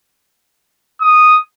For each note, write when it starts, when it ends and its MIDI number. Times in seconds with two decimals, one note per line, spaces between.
1.01 1.38 87